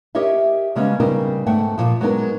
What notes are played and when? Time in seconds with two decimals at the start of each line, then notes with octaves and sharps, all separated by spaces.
0.15 G4 A#4 C#5 D#5 E5
0.75 C#3 G3 G#3 A#3 B3 C#4
1.00 C#3 G3 B3 C4 D#4 A#4
1.46 G#2 A3 F#5 G5
1.78 A#2 F3
2.01 F#3 G#3 B3 D#4 A#4